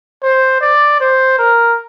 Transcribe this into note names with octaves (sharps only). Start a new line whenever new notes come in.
C5
D5
C5
A#4